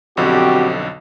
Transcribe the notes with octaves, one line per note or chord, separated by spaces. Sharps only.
B1 F2 D3 C4 F#4 G4